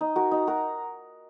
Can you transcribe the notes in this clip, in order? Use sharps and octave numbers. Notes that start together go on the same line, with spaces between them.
D#4
F#4 A#4
D#4
F#4 A#4